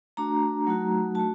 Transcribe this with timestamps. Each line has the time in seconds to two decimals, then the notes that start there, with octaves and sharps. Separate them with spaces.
0.17 A3 D4 F#4 A#5
0.67 F#3 A3 D#4 F#4
1.15 A3 D4 F#4 A5